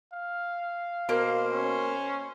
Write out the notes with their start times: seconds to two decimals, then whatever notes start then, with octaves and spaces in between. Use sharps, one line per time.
0.13 F5
1.09 B2 A#3 C5
1.52 C#4